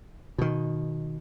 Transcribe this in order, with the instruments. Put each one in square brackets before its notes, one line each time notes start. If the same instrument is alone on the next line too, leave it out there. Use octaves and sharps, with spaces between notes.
[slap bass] B2 D#3